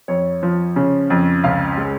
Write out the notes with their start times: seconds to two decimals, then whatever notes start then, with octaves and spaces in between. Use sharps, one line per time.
0.08 F2 C#5
0.43 F3
0.76 C#3
1.10 F2
1.44 C#2 F5
1.77 G#3